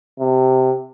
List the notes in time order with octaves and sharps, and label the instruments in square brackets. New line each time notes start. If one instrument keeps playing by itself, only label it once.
[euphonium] C3